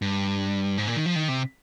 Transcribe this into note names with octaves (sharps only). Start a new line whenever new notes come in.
G2
G#2
A#2
D#3
F3
D#3
C3